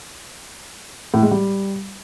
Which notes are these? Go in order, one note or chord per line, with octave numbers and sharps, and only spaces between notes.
A2
G#3
G3